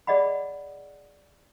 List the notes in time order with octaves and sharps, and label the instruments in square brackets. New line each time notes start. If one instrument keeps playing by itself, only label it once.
[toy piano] G#4 D5 D#5 F#5 B5